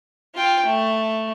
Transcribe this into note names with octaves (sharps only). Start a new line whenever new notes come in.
F4 G5
A3